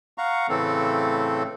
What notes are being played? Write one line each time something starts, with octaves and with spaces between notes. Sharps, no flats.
F5 F#5 A#5 C#6
A2 C#3 E3 A3 C4 A4